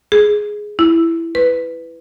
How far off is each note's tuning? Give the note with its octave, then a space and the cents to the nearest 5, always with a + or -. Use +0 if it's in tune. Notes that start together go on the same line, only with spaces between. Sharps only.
G#4 +5
E4 +10
B4 +10